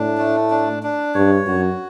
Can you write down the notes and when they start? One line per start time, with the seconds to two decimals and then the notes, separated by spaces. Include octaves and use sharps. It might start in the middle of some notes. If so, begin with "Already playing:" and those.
Already playing: A2 D4
0.18 A3
0.50 D4
0.83 D4
1.14 G2 C#5
1.46 F#2 F#4